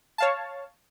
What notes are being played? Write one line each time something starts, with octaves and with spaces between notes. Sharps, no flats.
C#5 F5 A5